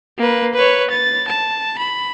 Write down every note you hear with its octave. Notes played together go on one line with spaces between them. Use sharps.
A#3 B4
B4 C#5
A6
A5
B5